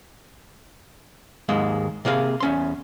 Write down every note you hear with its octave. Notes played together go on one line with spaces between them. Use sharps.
D#2 G#2 G#3 A#3
C3 A#3 G#4 F5
E2 C#4 C6